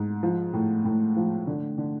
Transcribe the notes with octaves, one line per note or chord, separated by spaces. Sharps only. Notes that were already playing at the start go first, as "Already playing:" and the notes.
Already playing: G#2
F3
A2
A2
F3
D3
D3